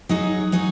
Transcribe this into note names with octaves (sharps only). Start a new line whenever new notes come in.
F#3 D#4 G#4 C#5
F#3 D#4 G#4 C#5